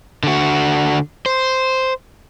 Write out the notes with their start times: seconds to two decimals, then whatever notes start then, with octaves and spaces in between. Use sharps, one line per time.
0.23 D3 F#4
1.26 C5